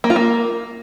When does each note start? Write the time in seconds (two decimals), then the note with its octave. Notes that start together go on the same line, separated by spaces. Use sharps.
0.04 A#3
0.10 F4
0.16 A#3